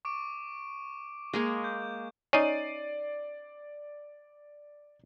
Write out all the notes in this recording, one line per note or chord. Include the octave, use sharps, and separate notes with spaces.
C#6 D6 D7
G#3 A#3 G#4
G6
C#4 D#4 D5 C7 D#7